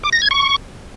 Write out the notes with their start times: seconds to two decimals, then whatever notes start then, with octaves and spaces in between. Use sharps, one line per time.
0.03 D6
0.13 A#6
0.22 G#6
0.31 C#6